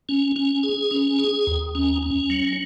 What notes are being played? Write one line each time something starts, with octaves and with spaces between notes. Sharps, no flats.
C#4
C#4
G#4
C#4
G#4
D#2
C#4
C#4
F#3